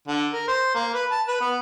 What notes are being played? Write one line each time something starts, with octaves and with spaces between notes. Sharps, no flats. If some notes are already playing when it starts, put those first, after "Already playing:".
D3
A#4
C5
A#3
B4
A5
B4
B3